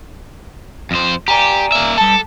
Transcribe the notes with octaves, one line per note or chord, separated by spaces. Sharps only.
F2 C5
G4 D5 G#5 A#5
A#3 E5
G3 A4 A5